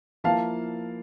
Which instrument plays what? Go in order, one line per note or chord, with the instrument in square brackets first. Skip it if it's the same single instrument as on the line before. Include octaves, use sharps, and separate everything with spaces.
[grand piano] F3 A#3 E4 [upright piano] F5 A5